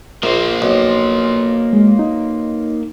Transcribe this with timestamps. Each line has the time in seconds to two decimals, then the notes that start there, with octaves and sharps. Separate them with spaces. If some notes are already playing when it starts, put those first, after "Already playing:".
0.23 A#1 A#3 C5
0.62 B1
1.73 G#3
1.99 D#4